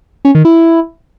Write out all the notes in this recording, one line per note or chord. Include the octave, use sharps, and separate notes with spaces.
C#4
D#3
E4